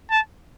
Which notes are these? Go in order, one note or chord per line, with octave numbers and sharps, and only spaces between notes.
A5